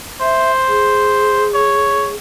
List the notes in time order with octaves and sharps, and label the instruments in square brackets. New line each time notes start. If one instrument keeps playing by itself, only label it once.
[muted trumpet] C5 [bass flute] E5
[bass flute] G#4
[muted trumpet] C#5